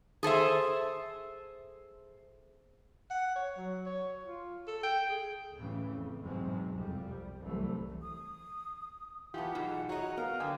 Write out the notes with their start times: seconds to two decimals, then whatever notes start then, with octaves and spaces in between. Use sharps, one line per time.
0.23 G#4 A4 C5 E5
3.10 F#5
3.36 C#5
3.57 F#3
3.86 C#5
4.25 F4
4.67 A4
4.83 G5
5.09 G#4
5.55 C#2 A2 C#3 E3
5.89 F2
6.23 E2 G#2 B2 F#3 G#3 C4
6.72 C2 F2 G3
7.40 C2 E3 F#3 A3
8.02 D#6
9.34 E3 B3 F4 G4 F#5 A5
9.55 B2 F#3 D#4 F4 G#4
9.89 F#4 C#5 D#5 A#5
10.18 B3 A#4 F5
10.40 D3 F#3 G5 G#5 D#6